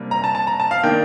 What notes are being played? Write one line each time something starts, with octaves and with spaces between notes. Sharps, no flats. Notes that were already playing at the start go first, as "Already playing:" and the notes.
Already playing: C3 G3 A#3 D4
A#5
A5
A5
A#5
A5
F5
D#3 A#3 D4 G5